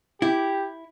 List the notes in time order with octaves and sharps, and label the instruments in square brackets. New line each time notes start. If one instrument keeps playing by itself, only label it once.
[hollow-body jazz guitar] E4 [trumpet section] G4